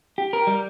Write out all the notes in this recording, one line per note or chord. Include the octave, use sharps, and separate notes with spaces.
G4
A#4
G3